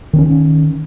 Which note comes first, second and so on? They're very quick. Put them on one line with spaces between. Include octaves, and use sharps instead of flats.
D#3 C4 C#4